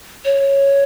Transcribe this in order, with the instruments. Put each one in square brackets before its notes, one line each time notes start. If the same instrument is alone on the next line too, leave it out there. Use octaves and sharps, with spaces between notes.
[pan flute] C#5